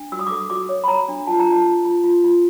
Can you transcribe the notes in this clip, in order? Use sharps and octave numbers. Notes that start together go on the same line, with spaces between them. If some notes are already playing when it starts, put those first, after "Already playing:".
Already playing: D4
F#4 E6
D#6
D6
A4 D#6
F#4 D6
C#5
B5
C#5 A#5
D4
F4 A5
A#5
F4
A5
F4
F4
F4
F4